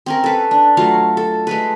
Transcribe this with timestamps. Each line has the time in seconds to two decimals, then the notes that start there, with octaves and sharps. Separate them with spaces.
0.06 C4 C#4 A#4
0.24 A4 B4
0.51 D4
0.77 F#3 A3 F4 F5
1.17 A4
1.47 G#3 A3 B4